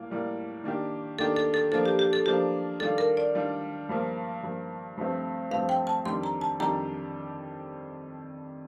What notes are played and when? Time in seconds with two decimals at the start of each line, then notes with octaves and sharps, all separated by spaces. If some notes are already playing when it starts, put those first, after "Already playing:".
Already playing: A2 G3 A#3 F4
0.10 A2 G3 A#3 F4
0.64 D#3 A#3 D4 G4
1.19 D#3 A#3 D4 G4 A4
1.36 A4
1.54 A4
1.72 F3 A#3 D4 F4 A4
1.86 G4
1.99 G4
2.13 A4
2.26 F3 A#3 D4 F4 G4
2.80 D#3 G3 D4 F4 A4
2.98 A#4
3.17 D5
3.35 D#3 G3 D4 F4
3.89 G2 F3 A#3
4.43 G2 F3 A#3
4.97 G2 F3 A3 C4
5.51 G2 F3 A3 C4 F5
5.69 G5
5.87 A5
6.05 F2 D#3 G3 D4 G4 C6
6.24 A#5
6.41 A5
6.60 F2 D#3 G3 D4 G4 A#5